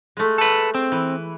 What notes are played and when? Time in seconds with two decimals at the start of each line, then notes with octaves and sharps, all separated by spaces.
0.17 G#3 A3
0.38 A4 B4
0.75 C4
0.92 E3